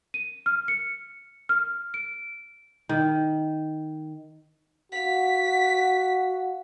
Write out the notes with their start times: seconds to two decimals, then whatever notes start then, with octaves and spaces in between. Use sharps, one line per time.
0.14 D#7
0.46 F6
0.68 C#7
1.49 F6
1.94 D7
2.89 D#3
4.92 F#4 F5 F#5 B6